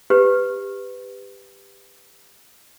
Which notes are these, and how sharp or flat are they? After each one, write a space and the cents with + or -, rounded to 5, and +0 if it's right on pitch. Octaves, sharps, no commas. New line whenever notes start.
G4 +15 B4 +15